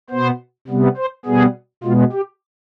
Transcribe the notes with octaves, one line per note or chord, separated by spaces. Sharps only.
B2 B3 C5
C3 G3 B3
C5
B2 G3 B3 G#4
B2 G#3 B3 F4
G4